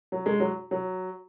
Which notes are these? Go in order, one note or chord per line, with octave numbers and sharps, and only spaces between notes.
F#3
G#3
F#3
F#3